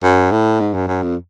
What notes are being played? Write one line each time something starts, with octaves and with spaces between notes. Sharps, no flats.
F#2
A2
G#2
F#2
F#2
F2